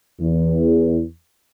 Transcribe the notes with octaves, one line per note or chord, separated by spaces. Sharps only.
E2